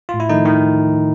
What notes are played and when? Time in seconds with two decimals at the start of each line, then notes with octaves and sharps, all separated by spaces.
0.09 A2 F4
0.20 E4
0.29 D#3 F3 A3 D#4
0.45 A2 D#3 D#4